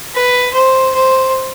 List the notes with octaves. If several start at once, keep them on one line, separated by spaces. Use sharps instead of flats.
B4
C5
C5